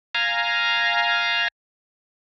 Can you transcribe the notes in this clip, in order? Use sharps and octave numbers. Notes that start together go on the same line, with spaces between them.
F5 G#5 A#5